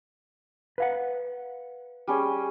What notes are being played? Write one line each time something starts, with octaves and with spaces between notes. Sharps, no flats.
B4 F5 F#5
G3 C#4 G#4